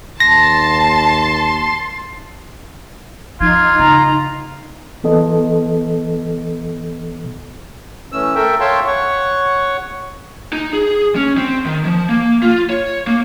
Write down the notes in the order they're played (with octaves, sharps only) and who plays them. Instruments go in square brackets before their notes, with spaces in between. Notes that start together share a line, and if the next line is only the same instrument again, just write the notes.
[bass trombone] D#2 [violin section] A5 [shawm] C6 [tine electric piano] A#6
[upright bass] F3 [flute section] D#4 [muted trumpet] F4 [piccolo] G#6
[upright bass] C#3 [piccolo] A#5
[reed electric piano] E3 B3 A4 D#5
[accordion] E3 A3 C#4 E6
A4 A#4 E5 G5
C#5 E5 F5 G5 A5 C6
C#5 F#5 C#6
[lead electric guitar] D#4
G#4
C#4
C4
D#3
F3
A#3
F4
C#5
A#3